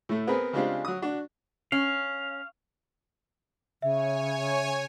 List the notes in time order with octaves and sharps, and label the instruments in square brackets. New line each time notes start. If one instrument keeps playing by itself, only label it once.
[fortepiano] A2 A3
B3 C4 G#4 A#4 B4
C#3 G#3 C4 D4 F4 G4
F#3 D#6
D4 F#4
[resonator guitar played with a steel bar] C#4 [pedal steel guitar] F5
[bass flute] C#3 [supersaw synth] C#5 G#5 [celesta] E5